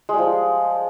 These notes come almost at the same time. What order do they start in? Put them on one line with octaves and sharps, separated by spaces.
G#3 G3 F3